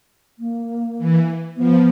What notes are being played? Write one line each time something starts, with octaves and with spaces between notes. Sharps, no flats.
A#3
E3
F3 B3